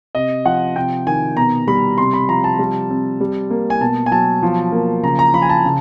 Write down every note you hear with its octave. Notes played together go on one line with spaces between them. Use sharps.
C3 D#5
F3 F#5
C3 G5
D#3 G#5
B2 A#5
G3 B5
C3 C6
B5
F3 A#5
A5
G3
C4
G3
A#3
G#5
B2 A5
G#5
F#3 A5
F3
A#3
C#3 A#5
A#5
F3 B5
G#5
A5
C#3